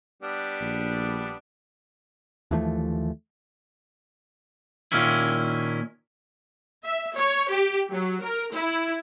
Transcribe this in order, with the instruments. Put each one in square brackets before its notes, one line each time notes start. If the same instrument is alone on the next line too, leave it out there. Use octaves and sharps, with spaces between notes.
[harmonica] G3 B3 D4
[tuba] A#1
[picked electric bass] D#2 E3 F3 A3
[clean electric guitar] A#2 D#3 A#3 C#4 E4
[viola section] E5
C#5
G4
F#3
A#4
E4